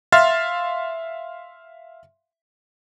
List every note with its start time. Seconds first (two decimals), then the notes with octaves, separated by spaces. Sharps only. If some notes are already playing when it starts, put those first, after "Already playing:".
0.12 E5 F5 C6 F6 A6